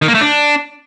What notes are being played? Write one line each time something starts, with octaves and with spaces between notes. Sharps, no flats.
D#3
A#3
A3
D4